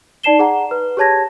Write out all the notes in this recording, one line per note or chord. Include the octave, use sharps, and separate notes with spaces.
D#4 D5 A5 C7 E7 G7
G#4 F#5 A#5
B4
G4 G#4 C#5 A5 G#6 A#6